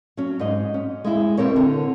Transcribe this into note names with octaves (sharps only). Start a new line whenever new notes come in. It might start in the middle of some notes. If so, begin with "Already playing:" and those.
F#3 C#4
G#2 D#5
C#4
G#3 E4
B2 C4 A#4 C#5
D3